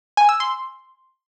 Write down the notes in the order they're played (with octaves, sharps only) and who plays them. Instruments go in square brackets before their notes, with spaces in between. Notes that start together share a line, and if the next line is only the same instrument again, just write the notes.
[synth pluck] G#5
E6
C6